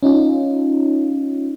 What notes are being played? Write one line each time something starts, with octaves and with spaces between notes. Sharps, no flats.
C#4 D#4 F4